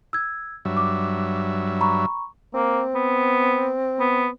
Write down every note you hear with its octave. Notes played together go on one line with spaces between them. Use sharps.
E6 G#6
G2 F#3 E5
D6
A#5 B5 C#6
A#3 C4
B3
B3